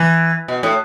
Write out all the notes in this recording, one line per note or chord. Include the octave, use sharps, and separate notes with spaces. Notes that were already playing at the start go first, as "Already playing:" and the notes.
Already playing: E3
B2
A2